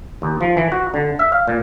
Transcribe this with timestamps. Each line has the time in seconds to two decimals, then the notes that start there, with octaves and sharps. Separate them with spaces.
0.22 D#2
0.41 F3
0.57 E3
0.72 F#4
0.94 D3
1.19 E5
1.32 F5
1.48 A#2